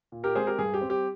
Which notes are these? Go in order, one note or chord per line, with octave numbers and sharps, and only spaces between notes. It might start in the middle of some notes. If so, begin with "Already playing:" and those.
A#2
G4 A#4
G#3 C4 G#4 C5
G4 A#4
G2 G#4
G4
G3 C4
G4